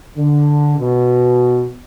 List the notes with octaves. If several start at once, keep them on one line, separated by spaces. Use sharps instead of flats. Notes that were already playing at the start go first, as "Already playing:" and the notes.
D3
B2